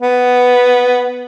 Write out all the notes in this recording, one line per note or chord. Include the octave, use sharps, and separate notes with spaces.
B3